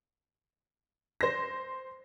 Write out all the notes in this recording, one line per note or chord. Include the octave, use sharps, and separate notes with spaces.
C5 A#6